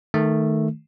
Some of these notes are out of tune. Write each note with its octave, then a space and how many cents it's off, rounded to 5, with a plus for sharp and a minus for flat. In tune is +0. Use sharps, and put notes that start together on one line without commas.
D#3 +0 A3 +0